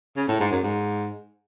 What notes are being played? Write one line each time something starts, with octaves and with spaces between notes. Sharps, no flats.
C#3
A2
G#2
F#2
G#2